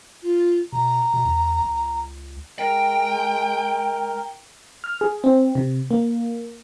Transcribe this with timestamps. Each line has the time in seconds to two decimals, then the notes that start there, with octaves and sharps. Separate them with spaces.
0.22 F4
0.73 B2 A#5
1.14 B2
1.25 E2
1.62 C#2
2.59 G#3 A#4 G5
4.84 F6
5.01 G#4
5.24 C4
5.55 C3
5.91 A#3